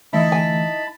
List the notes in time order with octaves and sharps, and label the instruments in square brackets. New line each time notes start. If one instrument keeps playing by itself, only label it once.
[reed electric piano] D3 E3 A3 [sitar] D#4 E4 [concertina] A5 B5
[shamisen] G#5